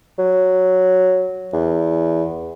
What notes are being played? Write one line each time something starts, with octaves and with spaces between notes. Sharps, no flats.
F#3
E2